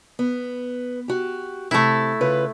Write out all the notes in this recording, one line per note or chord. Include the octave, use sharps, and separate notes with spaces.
B3
F#4 G4
C3 A3 E4 A5
C#3 F4 B4